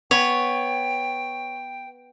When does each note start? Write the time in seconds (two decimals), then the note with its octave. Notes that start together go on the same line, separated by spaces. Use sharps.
0.11 B3 C#5 G5